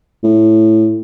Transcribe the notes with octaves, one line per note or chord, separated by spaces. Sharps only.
A2